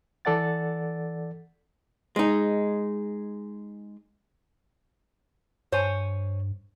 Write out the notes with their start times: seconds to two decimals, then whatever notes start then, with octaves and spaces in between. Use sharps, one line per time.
0.25 E3 A4 D5 F#5 A6
2.16 G#3 D#4
5.72 G2 C5 C#5 G#5